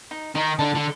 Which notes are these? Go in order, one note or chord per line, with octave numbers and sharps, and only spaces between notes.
D#4
D#3 D#4
D3 A5
D3